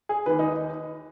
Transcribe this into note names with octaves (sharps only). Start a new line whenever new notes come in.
G#4
D#2 D#3 B4
D#4